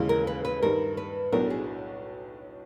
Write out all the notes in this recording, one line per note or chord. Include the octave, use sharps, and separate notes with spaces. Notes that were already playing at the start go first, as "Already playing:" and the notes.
Already playing: D#2 C#3 E3 G#3 C#4
A#4
B4
B4
G2 D#3 G3 A#4
B4
B1 A2 F#3 B3 D4 A#4
G#4